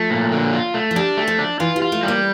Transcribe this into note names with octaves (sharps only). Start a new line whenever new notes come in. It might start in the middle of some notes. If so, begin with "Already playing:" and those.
Already playing: F3 A3
A#2
D3
F4
A3
F3
G3 D4
A3
F3
D4
E3 F4
G3
F4
A3
G3
A#3